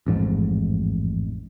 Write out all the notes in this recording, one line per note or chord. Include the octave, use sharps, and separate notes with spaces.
A1 F2 G#2